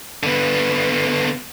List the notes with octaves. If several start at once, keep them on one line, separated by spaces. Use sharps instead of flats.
D3 B3